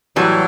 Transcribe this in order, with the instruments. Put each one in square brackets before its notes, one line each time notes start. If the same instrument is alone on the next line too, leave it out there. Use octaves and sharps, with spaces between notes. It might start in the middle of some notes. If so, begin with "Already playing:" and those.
[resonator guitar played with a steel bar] A2 E3 G3 [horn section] F#3